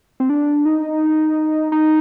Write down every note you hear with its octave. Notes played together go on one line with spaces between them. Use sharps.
C4
D4
D#4
D#4